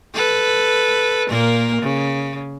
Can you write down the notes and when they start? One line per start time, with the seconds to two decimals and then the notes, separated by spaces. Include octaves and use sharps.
0.14 A4 B4
1.28 A#2 A#3 A#4
1.82 C#3